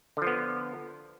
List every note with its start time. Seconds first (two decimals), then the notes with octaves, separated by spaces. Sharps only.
0.17 D3
0.22 F3
0.27 B3